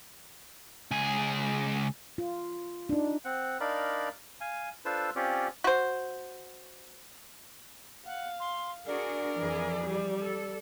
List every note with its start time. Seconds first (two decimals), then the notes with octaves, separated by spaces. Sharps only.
0.91 C#2 G#4
2.18 F4
2.89 D4 D#4
3.25 C4 F#5
3.60 D4 D#4 A#4 D5 F5 B5
4.41 F5 G#5
4.85 D4 F4 A4 B4 C5 E6
5.16 C4 C#4 F4 G4 C#5 D5
5.64 F#4 C5
8.06 F5 F#5
8.40 C6
8.87 D4 F#4 G#4 A#4 D5
9.38 F2 E3 G#4
9.85 G3
10.23 A4